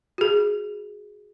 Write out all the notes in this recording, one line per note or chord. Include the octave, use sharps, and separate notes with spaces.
F#4 G#4